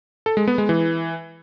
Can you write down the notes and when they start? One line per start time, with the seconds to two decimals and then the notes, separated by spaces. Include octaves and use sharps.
0.26 A4
0.37 G#3
0.48 B3
0.58 G#3
0.69 E3